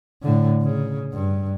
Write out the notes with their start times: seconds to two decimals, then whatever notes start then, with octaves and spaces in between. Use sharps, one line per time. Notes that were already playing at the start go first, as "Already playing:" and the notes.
0.23 A2 D3
0.63 C#3
1.13 G2